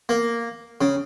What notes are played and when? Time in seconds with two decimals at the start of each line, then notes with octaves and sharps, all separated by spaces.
0.09 A#3
0.81 C#3